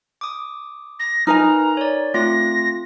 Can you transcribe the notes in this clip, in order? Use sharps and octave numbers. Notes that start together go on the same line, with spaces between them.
D6 D#6
A#6
D#4 A#4 B4 G#5 A#5 F6
C#5 D5
A3 C4 F4 A#6